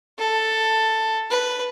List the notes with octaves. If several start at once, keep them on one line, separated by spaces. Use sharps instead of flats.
A4
B4